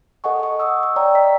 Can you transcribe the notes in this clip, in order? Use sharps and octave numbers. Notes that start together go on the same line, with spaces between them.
A4 D#5 F#5 G#5 C#6
G#5 C#6
C#6 D#6 E6
E6
C#5 D5 G5 A#5
D#5 A#5 B6